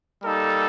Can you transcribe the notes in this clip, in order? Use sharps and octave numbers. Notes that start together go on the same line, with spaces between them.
G3 A#3 D#4 A4